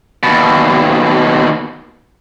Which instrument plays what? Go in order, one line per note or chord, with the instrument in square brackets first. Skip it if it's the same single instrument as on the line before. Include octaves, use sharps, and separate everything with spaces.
[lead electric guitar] D#2 B2